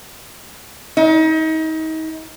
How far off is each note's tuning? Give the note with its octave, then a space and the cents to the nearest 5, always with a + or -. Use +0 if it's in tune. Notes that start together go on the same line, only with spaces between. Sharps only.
D#4 +35